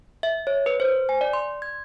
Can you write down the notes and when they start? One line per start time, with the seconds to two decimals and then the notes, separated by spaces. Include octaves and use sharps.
0.23 E5
0.47 C#5
0.66 B4
0.80 C5
1.09 G#5
1.21 D5
1.33 C6
1.62 G#6